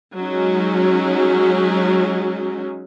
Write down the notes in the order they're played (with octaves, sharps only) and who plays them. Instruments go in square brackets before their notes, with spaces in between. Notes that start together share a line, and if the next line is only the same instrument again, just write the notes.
[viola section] F#3 G#3 C#4 D#4